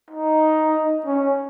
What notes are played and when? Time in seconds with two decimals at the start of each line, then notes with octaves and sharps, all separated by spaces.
0.11 D#4
1.06 C#4